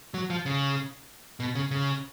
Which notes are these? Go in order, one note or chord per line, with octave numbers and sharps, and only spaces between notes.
F#3
F3
C#3
B2
C#3
C#3